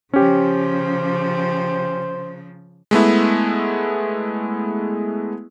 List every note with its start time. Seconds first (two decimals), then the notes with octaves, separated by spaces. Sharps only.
0.13 C#3 F3 C#4 G4 C5
2.91 G#3 A3 B3 E4